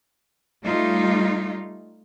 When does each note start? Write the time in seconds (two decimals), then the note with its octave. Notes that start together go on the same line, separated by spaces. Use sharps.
0.62 G3 A3 D#4 F4